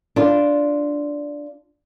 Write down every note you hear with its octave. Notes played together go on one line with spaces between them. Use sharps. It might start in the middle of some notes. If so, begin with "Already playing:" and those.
D4 F4